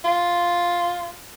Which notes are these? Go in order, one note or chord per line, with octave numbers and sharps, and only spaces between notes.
F4